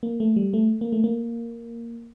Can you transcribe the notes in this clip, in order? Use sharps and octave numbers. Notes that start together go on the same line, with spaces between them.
A#3
A3
G3
A3
A#3
A3
A#3